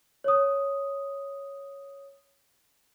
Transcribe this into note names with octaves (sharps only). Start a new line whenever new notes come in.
C#5 D#6